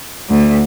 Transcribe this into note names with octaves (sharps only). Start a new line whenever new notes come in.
D2